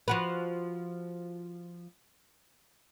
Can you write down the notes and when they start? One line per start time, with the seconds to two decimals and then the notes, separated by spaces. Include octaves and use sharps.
0.08 F3 F#4 B4